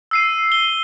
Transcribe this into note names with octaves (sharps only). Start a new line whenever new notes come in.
E6 C7 D#7
G7